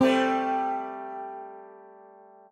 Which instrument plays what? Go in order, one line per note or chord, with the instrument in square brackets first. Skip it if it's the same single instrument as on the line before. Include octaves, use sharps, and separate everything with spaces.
[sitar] G3 A3 G4 [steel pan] C4